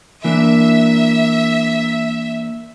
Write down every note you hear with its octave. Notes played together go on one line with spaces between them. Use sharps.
E3 A#3 D4 E5